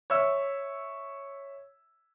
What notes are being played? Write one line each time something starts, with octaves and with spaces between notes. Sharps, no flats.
C#5 E5 E6